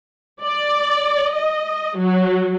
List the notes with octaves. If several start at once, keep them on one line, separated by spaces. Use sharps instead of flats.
D5
D#5
F#3